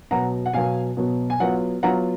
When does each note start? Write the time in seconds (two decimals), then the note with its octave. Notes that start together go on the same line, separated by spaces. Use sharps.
0.11 B2 F#3 B3 F#5 A#5
0.46 F#5
0.53 B2 F#3 B3 F5 G#5
0.97 B2 F#3 B3
1.30 G#5
1.40 F#3 B3 F4 F#5
1.83 F#3 B3 F4 F#5 A#5